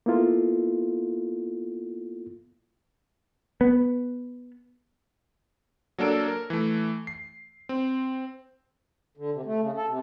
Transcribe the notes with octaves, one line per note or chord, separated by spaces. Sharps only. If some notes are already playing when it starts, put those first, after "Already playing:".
A#3 B3 E4 F4 A4
B3
F#3 A#3 D4 A4 D7
A#4
E3 A3
C7
C4
D3
C3
A3
C#3
A4
C3